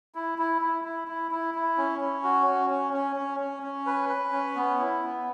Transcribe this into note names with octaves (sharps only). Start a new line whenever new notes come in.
E4
E4
E4
E4
E4
E4
E4
C#4
C#4
F#4
C#4
C#4
C#4
C#4
C#4
C#4
B4
B4
C#4
B3
E4
B3